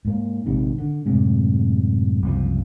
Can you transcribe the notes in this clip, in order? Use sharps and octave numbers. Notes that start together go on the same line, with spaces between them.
G#2 A#3
A#1 G#2 C3 D#3
D3
F#2 A2 C3 G#3
F#1 C2 C3 F3